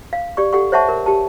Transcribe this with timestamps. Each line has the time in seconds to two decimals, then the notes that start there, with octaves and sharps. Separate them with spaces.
0.13 F5
0.37 G4 D5 C#6
0.53 G4 A4 F#5 C#6
0.72 C5 C#5 E5 F#5 A5 C#6
0.89 A#4
1.06 G4 A5